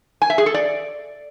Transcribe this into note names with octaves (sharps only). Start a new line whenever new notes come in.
G#5
E5
G#4
A4
D5